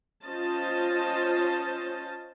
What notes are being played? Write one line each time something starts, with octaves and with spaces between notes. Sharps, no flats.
C#4 F4 C5 D#5 A5